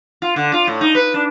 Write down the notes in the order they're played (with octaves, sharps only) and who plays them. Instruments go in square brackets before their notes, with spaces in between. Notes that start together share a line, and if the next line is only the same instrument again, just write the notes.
[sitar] F4
D3
F4
A2
D#4
B4
D4